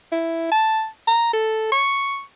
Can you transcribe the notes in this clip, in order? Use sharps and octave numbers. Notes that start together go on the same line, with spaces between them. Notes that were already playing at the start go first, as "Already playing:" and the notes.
E4
A5
A#5
A4
C#6